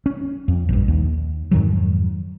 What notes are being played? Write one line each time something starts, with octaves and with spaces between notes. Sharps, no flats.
C#4
F2
A#1 G2
D#2
F2 G#2 D#3 F#3